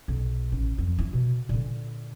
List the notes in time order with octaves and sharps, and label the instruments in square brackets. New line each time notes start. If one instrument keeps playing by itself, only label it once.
[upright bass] B1
A1
F2
E4
B2
A#2 D3